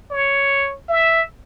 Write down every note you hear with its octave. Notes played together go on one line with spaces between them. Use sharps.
C#5
E5